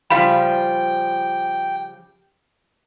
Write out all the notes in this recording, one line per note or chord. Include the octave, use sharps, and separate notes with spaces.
C#3 F3 G3 F5 G5 B5